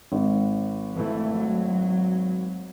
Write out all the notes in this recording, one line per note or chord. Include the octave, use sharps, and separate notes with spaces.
G#1
E3 A3
F#3